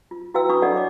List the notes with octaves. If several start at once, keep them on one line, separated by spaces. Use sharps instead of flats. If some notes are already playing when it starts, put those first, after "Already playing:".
F4
E4 F#4 B4 F5 G5 E6
D4 F#4 B5 C#6 D#6
D4 A4 D5 D#5 F5 F#5
C#5 D#5 D6